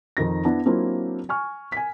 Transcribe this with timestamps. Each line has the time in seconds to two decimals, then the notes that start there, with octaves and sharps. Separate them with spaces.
0.17 F2 D#3 D#4 A#6
0.44 B3 D4 E4
0.65 F#3 A#3 C4 D4 E4 F4
1.29 G#5 C#6 F6
1.72 G#5 B6